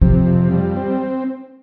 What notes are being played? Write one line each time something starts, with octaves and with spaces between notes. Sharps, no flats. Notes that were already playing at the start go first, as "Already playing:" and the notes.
C3 F3
F2
G3
C4